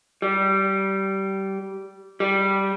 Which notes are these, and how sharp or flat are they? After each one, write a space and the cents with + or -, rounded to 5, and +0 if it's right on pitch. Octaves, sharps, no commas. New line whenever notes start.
G3 -20
G3 -10